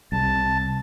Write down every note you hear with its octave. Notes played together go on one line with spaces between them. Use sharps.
C2 C3 A5